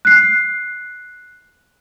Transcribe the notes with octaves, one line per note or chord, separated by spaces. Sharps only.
F#6 C7